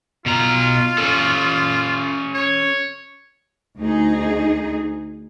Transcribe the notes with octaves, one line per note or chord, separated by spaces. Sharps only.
B2 F4 A#5
C#4 A4
C#5
D2 D#4 G#4